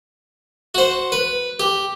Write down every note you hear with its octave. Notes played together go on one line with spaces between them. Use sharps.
F#4 C5
B4
G4